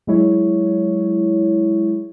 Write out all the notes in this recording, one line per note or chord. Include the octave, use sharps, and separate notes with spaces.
F#3 G#3 E4 C#5